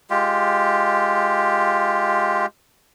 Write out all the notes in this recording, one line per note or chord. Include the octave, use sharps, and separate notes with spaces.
G#3 F4 G4